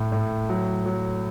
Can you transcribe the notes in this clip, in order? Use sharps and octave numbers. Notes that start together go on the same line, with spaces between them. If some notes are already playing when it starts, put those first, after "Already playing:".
Already playing: A2
A2
F#3
F#3